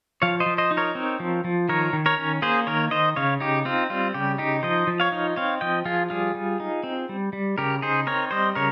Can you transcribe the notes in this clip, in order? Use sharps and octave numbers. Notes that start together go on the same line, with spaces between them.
F3 C#5 F5
C5 D#5
F3
C5 D#5
D#4
A#4 C#5
C4
F3
F3
D#3 A#4 C#5
D#3
A#4 C#5
C#4
A#3 G#4 C5
D#3 A#4 C#5
D#3 C5 D#5
C#3 C#5 F5
D#4 G4
C4 F4
G3 F4
C#3 G4
D#4 G4
F3 C5 D#5
F3
C#5 F5
D#4
C4 C#5 F5
F3 D#5 G5
F3 F4 G#4
G3 F4 G#4
G3
D#4
C4
G3
G3
C#3 G4 A#4
D#4 G#4 C5
C4 A#4 C#5
G3 C5 D#5
C#3 A#4 C#5